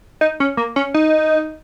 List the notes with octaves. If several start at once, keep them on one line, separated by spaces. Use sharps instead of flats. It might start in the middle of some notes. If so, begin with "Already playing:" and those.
D#4
C#4
A#3
C#4
D#4